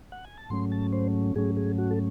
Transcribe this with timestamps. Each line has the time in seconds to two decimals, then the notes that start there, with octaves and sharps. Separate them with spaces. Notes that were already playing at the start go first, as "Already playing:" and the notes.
0.12 F#5
0.25 G#5
0.37 A5
0.50 G#2 F#3 A3 C#4 C6
0.72 A5
0.92 C5
1.36 G#2 F#3 A3 C#4 G#4
1.57 G#4
1.78 F#4
1.91 A4